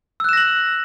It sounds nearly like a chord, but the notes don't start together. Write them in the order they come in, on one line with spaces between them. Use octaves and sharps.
E6 F#6 E7 A#6 F#7